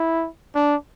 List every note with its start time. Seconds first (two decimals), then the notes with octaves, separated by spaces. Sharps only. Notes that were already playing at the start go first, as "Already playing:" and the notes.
Already playing: E4
0.55 D4